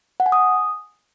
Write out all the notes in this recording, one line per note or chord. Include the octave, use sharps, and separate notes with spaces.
F#5
G#5
D#6